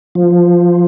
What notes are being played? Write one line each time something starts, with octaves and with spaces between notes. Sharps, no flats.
F3